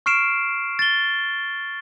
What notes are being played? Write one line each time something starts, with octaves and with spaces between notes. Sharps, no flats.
C#6 F6 C7 D7 E7
A6 G7